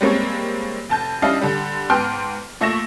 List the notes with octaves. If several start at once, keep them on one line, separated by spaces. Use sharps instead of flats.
G3 G#3 A#3 C4 C#5
F1 A5 G6
G3 C#4 D4 E4 D#5 F5
D3 G3
G#2 B3 G5 A5 C6 F6
A#2 A3 E5 C#6 A#6 E7